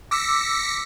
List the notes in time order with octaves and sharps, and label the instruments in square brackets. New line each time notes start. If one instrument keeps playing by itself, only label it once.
[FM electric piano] D6 E6 [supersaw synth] A#6 B6 C#7